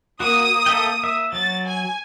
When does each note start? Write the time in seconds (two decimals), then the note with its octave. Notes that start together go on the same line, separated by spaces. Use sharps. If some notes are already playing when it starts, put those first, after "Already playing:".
0.20 A#3 F#4 D#6
0.66 A4 E5 G5
1.04 E5
1.33 F#3 A6
1.66 G#5